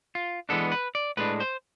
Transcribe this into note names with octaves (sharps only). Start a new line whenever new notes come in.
F4
E3 G#3 B3 D4 A4
B4
D5
A2 G#3 D4 B4
C5